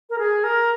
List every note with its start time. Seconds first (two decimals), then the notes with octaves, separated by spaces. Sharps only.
0.10 A#4
0.19 G#4
0.44 A#4